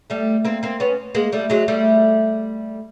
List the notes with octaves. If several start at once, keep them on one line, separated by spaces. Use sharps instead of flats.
G3 A3
A#3 C4
A#3 C4
B3 C#4
G#3 A#3
G3 A3
F#3 G#3
G3 A3